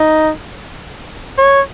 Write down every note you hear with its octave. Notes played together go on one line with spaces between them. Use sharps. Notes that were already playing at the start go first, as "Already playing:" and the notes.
Already playing: D#4
C#5